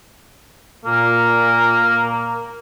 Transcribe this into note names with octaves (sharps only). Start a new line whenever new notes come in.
A#2 A#3 A#4